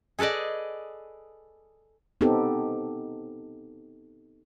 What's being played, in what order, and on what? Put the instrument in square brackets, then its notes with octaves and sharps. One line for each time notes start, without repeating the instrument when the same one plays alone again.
[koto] G#4 A4 B4 D5 D#5
[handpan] B3 C4 D#4 G4 A4